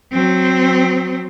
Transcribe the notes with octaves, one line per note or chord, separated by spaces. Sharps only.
F#3 C4